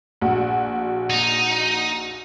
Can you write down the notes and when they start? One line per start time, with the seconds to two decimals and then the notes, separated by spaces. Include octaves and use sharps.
0.21 A#1 F#4
1.10 D#4